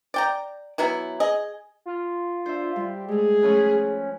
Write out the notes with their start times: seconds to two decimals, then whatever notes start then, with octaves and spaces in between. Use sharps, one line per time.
0.14 D5 G5 A#5
0.78 E3 F#3 B3 E4
1.20 G#4 D#5
1.86 F4
2.46 D4 C5 E5
2.76 G3 G4
3.08 G#3 A3 G#4
3.43 F3 A3 C#4 B4